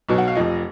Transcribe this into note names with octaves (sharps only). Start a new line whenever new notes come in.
B1 B2 F#3
F#5
F5
F1 F2 F3 D#5